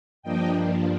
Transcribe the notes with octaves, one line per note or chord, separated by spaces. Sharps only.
G2 F3 A#3 D4 D#5 G5